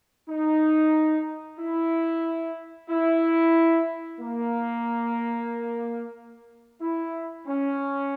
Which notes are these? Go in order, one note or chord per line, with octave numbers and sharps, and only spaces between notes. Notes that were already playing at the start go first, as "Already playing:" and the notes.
D#4
E4
E4
A#3
E4
C#4